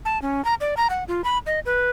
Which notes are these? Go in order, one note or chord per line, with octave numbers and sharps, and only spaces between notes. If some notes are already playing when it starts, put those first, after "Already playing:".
A5
C#4
A#5
D5
A#5
F#5
F4
B5
D#5
B4